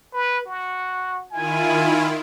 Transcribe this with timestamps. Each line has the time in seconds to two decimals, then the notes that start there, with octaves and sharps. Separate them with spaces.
0.13 B4
0.46 F#4
1.31 D#3 E4 F4 G#5